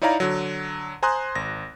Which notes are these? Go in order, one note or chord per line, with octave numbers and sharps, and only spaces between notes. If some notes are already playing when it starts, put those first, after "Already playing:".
D#4 E4 C#5 D5 F5 A#5
D3 F#3
C5 G#5 A#5 C6 D#6 F#6
G#1 A#6